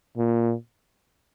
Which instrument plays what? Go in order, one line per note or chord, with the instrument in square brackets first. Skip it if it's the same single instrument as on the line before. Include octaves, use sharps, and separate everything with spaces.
[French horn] A#2